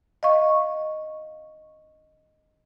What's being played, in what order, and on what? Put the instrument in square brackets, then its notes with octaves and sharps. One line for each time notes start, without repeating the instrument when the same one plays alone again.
[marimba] D#5 F5 C#6